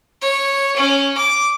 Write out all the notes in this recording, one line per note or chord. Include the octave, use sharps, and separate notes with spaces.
C#5
C#4
D6